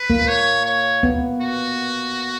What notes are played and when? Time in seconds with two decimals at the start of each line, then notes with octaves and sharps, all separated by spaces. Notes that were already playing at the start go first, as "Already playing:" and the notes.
Already playing: B4
0.10 A#3
0.28 C#5
0.66 C#5
1.03 B3
1.41 F#4